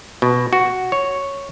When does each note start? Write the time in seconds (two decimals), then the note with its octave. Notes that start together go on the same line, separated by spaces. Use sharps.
0.22 B2
0.53 F#4
0.92 C#5